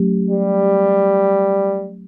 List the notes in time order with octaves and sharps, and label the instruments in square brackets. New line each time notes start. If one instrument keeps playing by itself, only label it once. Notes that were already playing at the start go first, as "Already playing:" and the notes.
Already playing: [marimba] F#3 A3 C#4 G4
[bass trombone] G3